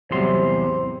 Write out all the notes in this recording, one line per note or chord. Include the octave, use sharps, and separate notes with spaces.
E2 A2 C3 F#3 G3 C5 C6